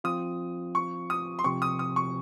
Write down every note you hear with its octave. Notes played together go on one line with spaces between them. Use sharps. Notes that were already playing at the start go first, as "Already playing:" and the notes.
F3 C4 F4 D#6
C#6
D#6
C6
C3 F3 C4 C#6
D#6
D#6
C#6